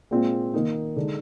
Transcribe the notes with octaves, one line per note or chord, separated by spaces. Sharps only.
A#2 G#3 C4 F4
D#3 A#3 D#4
D3 G#3 D#4